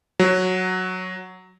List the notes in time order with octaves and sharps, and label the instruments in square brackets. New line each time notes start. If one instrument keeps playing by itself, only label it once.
[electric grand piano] F#3